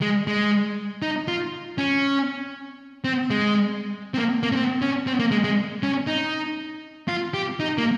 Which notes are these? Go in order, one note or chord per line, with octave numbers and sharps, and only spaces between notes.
G#3
G#3
D#4
F4
C#4
C4
G#3
C4
A#3
A#3
C#4
C4
C#4
C4
A#3
G#3
G#3
C#4
D#4
F4
G4
D#4
A#3